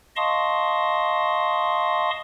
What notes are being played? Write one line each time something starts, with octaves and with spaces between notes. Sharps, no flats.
D#5 F5 A5 C6 C#6 D#6